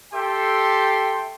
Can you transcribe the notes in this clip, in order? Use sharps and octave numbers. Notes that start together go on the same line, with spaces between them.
G4 A4 E5 G5 C6